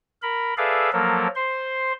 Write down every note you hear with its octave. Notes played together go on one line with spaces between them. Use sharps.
A#4 B5
G#4 A4 B4 D5 E5 F5
F3 F#3 A#3 A4 A#4
C5 C6